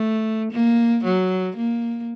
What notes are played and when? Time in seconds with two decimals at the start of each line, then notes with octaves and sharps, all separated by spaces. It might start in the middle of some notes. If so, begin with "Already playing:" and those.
Already playing: A3
0.52 A#3
1.04 F#3
1.57 A#3